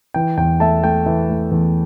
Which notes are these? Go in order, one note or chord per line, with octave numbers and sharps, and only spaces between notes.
E3 G5
E2 G5
A3 E5 A5
A3 G5
E3 E5
A3
E2